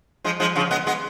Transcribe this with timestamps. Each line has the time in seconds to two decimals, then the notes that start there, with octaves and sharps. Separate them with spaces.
0.24 F3 G#3
0.40 F3 G#3
0.56 C#3 F3
0.71 G#3 B3
0.87 G#3 B3